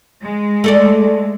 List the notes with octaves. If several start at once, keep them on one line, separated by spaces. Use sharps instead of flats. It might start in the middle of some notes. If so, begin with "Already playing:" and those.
G#3
A3 A4 D5